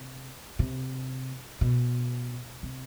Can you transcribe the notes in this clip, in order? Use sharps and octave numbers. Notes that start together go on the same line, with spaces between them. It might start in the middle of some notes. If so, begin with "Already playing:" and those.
Already playing: C3
C3
B2
C3